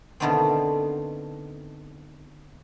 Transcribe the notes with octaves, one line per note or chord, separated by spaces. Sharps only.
B2 D3 D#3 A3 B3 C4